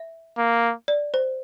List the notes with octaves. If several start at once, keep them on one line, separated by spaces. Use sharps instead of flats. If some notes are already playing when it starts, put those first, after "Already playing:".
Already playing: E5
A#3
D5
C5